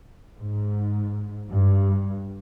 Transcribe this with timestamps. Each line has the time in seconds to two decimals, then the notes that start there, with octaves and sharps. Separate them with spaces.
0.37 G#2
1.49 G2